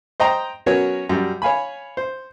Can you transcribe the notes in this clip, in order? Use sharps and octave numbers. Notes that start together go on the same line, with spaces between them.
C5 D#5 G5 A#5
F#3 B3 C#4 F#4 A#4 C#5
F#2 G3
C#5 F5 G#5 B5
C5